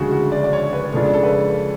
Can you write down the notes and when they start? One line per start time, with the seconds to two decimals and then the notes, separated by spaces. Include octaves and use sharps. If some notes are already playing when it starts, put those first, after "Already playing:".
Already playing: D2 C#3 F3 G#3 F#4 G#4
0.11 F#4
0.32 D5
0.44 D5
0.53 C#5
0.73 B4
0.93 F2 C#3 G#3 D4 F4 A4
1.14 A4
1.23 B4